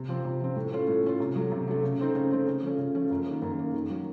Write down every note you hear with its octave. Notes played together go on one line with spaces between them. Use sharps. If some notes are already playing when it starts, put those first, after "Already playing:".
Already playing: C3
F3 C4
C3
F3 C4
A2
A3 C#4 F4
A2
A3 C#4 F4
C3
F#3 A3
C3
F#3 A3
C#3
A3 C4 D#4
C#3
A3 C4 D#4
C#3
F3 A3 C#4
C#3
F3 A3 C#4
F#2
D#3 A#3
F#2
D#3 A#3
D#3
F#3 A#3